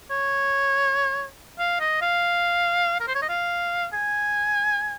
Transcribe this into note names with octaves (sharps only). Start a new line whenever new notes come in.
C#5
F5
D#5
F5
A#4
C5
C#5
D#5
F5
G#5